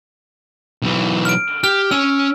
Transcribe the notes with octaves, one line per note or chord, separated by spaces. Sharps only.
B1 E3
F6 D7
G4 F6
C#4 G#5 E6